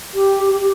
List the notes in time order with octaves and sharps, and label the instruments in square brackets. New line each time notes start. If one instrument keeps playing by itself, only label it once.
[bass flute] G4
G4